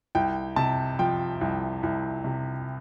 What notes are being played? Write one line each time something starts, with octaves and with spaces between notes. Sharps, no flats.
C2 G5
C3 A5
F3 G5
C2
C2
C3